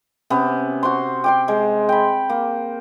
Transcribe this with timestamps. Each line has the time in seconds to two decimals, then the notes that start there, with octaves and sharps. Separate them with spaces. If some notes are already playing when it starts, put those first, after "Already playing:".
0.30 C3 B3 C#4
0.83 F#4 C5 C6
1.24 G4 G5 C6
1.48 G#3
1.89 G5 B5
2.30 A#3